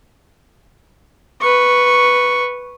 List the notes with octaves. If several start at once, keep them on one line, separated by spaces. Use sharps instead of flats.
B4 C#6